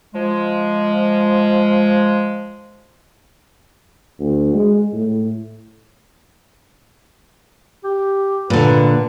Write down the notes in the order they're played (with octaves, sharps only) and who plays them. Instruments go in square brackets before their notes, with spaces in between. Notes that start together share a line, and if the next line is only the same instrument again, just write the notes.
[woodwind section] F3 G#3
[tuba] D2
G#3
A2
[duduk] G4
[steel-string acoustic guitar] A#2 D3 [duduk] B4